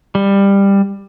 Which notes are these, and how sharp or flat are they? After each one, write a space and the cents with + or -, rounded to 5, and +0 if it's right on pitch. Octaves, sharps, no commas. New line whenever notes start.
G3 +15